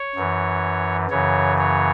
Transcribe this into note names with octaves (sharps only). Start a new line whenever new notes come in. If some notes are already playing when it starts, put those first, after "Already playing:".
Already playing: C#5
F#2 E3
F#2 C#3 E3 C#5
C#5